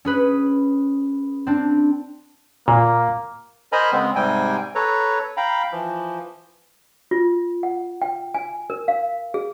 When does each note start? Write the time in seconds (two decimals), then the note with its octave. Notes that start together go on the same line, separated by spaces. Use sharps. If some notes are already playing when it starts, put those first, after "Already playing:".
0.05 C#4 G#4 B4
1.47 C4 D4
2.68 A#2 A#3
3.72 A#4 C5 D#5 G#5 A#5 B5
3.92 C#3 G#3 B3 C4
4.15 G#2 C3 G3 G5 G#5
4.75 A4 B4 C#5 A#5
5.37 F5 G5 A#5 B5
5.72 E3 F3
7.11 F4
7.63 F#5
8.02 G5
8.34 G#5
8.70 A#4
8.88 F5
9.34 G#4